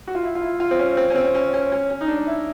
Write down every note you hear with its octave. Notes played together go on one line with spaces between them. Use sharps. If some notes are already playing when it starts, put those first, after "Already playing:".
F#4
F4
E4
F4
E4
F4
C4
C#4
C4
C#4
C4
C#4
C#4
C#4
C#4
D#4
D4
E4